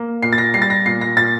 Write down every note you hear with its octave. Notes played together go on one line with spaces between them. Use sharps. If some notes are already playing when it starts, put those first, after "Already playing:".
Already playing: A#3
A#2 C7
A6
A#6
G3 C7
A6
A#6
A#2 C7
A#6
A#2 A6